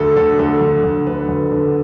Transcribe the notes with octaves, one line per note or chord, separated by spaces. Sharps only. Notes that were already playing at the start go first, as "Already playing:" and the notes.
Already playing: D2 D3 A4
D3 A4
D2 A4
D3
D2
D3 B4
D2
D3